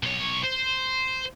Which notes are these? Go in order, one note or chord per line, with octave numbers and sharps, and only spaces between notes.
B1 C#5
C5